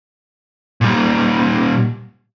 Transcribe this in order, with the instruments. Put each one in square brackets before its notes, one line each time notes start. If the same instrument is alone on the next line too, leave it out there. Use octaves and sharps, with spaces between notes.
[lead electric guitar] A#2 G3